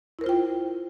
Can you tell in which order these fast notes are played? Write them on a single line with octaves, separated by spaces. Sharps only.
E4 A#4 C5 F4 G5